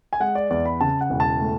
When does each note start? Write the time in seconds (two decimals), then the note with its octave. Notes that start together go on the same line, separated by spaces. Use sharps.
0.13 G#5
0.20 G#3 F#5
0.35 D5
0.50 E2 D5
0.66 B5
0.81 C#3 A5
1.01 F#5
1.10 E1
1.20 A5
1.40 A3